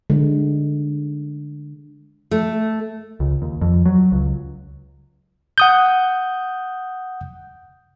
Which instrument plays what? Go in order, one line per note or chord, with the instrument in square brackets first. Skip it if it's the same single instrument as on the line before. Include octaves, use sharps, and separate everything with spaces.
[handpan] D3 G#3
[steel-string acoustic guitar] A3
[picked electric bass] C#2
D#2
F2
F#3
C#2
[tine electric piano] F#5 D#6 G6